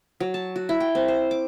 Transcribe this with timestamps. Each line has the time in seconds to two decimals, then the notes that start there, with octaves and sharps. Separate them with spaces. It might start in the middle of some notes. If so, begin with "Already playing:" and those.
0.20 F#3
0.34 A5
0.56 F#4
0.69 E4
0.80 G5
0.95 C4
1.08 C5
1.31 D6